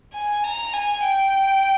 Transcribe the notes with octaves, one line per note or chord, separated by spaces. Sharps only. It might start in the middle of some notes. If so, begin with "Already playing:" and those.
G#5
A#5
G#5
G5